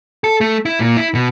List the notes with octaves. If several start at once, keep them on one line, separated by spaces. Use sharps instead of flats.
A4
A3
E4
A#2
E4
B2